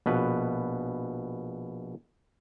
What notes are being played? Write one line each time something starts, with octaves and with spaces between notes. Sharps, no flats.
A#1 B2 B4